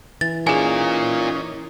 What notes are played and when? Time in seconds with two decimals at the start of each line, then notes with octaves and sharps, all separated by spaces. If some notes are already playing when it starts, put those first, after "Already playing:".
0.21 E3 A6
0.47 C#4 D#4 F4 G#4 A#4 G#5